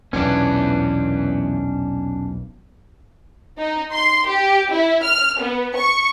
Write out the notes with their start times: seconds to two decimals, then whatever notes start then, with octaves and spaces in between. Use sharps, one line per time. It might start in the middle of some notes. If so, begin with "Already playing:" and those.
0.13 B1 E2 A#2 E3 B3 C#4 D4
3.58 D#4
3.93 C6
4.26 G4
4.70 E4
5.04 F6
5.39 B3
5.76 C#6